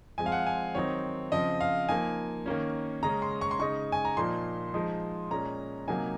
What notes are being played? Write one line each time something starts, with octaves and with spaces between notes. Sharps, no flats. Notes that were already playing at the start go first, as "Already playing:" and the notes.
F3 G#3 C4 G#5
F5
F#5
G#5
D#3 F#3 C4 D#4 C#5
C#3 F3 C4 D#5
F5
F3 A#3 D#4 G#5
D#3 A#3 C#4
C#3 G#3 C#4 A#5
C6
C#6
C6
C#3 G#3 D#4 C#6
G#5
A#5
A#2 F3 A#3 D#4 C6
F3 G#3 D#4
A#2 G#3 C#4 A#5
C3 F#3 A#3 D#4 G#5